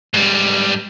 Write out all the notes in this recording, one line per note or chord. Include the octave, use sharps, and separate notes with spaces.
G#2 G3